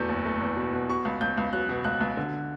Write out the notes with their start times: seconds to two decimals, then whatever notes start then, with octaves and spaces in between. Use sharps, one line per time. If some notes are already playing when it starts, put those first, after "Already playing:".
Already playing: E2 B2 A3 G6
0.09 F#1
0.25 A3
0.40 E2
0.56 B2
0.73 B2
0.89 B2 C#6
1.05 C#2
1.21 C#2 G6
1.38 C#2
1.53 F#3 F#6
1.69 B2
1.84 C#2 F#6
2.01 C#2
2.17 D3